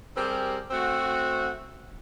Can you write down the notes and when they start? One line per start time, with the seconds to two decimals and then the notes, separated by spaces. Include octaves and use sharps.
0.16 G3 C4 G4 G#4 A#4
0.71 A3 C4 F#4